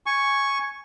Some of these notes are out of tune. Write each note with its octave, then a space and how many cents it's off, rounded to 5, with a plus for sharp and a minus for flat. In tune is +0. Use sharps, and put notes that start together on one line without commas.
G#5 +0 C#6 +0